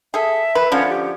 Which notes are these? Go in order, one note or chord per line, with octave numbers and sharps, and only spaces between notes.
G#4 A4 E5
B4
D3 F3 C#4
G4